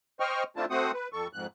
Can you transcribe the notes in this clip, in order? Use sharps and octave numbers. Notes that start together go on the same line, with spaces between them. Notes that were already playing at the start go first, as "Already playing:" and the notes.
C5 D#5 G5 C#6 F6
A3 C4 D4 E4 F4 A5
A3 C4 F#4 C5 F#5 D#6
B4
F2 A4 C#6
F2 G#2 F#6